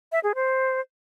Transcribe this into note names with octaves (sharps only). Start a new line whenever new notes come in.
E5
G#4
C5